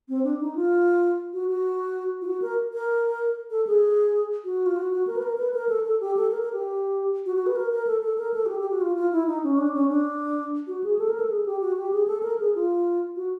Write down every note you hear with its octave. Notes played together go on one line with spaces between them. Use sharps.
C4
D4
D#4
F4
F#4
F#4
F4
F#4
A#4
A#4
A4
G#4
F#4
F4
F#4
F#4
A#4
B4
A#4
B4
A#4
A4
A4
G4
A4
A#4
A#4
G4
F#4
F#4
B4
A#4
A#4
A4
A4
A#4
A4
F#4
G4
G4
F#4
F4
F4
E4
D#4
C#4
D4
C#4
D4
F#4
G#4
A4
A#4
A4
G#4
G4
F#4
G4
G#4
A4
A#4
G#4
F4
F#4